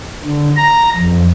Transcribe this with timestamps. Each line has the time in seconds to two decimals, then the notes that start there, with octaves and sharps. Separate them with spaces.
0.25 D3
0.57 A#5
0.97 F2